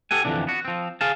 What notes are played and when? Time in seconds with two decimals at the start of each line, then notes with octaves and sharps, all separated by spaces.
0.11 G4 A4 F#5 G#5
0.25 F2 G#2 D3 E3 D4
0.47 B3 F#4
0.65 F3 C4
1.01 G#4 F5 A5